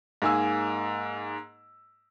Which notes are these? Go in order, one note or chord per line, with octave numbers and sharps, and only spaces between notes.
G#2 A#3 G#4 G#5 E6